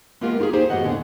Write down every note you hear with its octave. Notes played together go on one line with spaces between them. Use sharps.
G#3 A#3 B3 F4 G4 A#4
A#3 D#4 F4 G4 G#4
A#3 D#4 G4 G#4 C5
F#2 A2 B3 F#4 D#5 F#5
D#2 D3 G#4